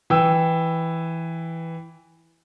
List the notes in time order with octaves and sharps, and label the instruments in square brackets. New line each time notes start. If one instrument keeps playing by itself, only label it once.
[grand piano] E3 G5 E6